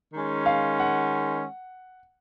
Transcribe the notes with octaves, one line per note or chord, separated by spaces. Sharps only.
D#3 G#3 C#4
F5
F#5